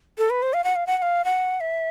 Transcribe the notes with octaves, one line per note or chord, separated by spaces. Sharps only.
A4
B4
C5
F5
F#5
F5
F#5
F#5
F5
F#5
E5